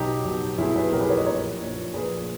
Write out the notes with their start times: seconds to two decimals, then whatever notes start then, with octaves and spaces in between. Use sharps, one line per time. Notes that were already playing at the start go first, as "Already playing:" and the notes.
Already playing: B1 B2 D#4 G4
0.25 B1 B2
0.58 B1 B2 E4 G#4
0.75 G#4 B4
0.92 B1 B2 G4 A#4
1.00 G#4 B4
1.09 A#4 C#5
1.17 B4 D#5
1.26 A#1 A#2 A#4 C#5
1.59 A#1 A#2
1.93 A#1 A#2 G#4 B4